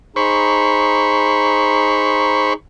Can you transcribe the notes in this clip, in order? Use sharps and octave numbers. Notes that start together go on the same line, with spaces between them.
D#4 G#4 C5 A#5 B5 C#6